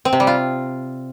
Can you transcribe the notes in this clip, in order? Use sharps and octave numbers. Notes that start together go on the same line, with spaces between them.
C4
C3
G3
F4